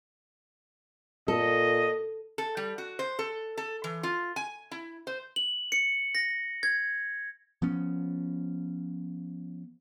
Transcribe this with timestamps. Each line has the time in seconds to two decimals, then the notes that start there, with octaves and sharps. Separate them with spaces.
1.28 A#2 A4 D#5
2.38 A4
2.57 G3
2.78 F#4
2.99 C5
3.19 A4
3.57 A4
3.84 E3
4.03 F4
4.36 G#5
4.71 E4
5.07 C5
5.36 F#7
5.72 C#7
6.15 A#6
6.63 G#6
7.62 F3 B3 C#4